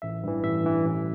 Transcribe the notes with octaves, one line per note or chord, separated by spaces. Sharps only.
A1 E5
G2 E3
A1 E5
G2 E3
A1